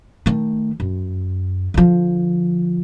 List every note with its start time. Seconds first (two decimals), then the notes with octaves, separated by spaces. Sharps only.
0.26 D#3 A3
0.80 F#2
1.74 D3 F3